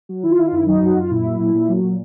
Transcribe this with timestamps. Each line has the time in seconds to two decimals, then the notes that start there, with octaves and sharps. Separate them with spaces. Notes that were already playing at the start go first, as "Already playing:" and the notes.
0.09 F#3
0.23 D#3 E4
0.31 F4
0.38 D#3 E4
0.47 F4
0.52 F#2 E4
0.67 F#3 D#4
0.81 F#2 F#4
0.96 F#2 F4
1.10 A#2 E4
1.25 F#3
1.40 A#2
1.54 A#2
1.69 F#3
1.83 A#2